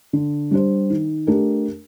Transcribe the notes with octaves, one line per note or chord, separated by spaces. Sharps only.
D3
G3 D4 G4 C5
D#3
A3 D4 G4 A#4